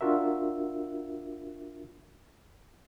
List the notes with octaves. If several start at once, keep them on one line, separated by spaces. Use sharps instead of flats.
D4 F4 F#4 A#4 E5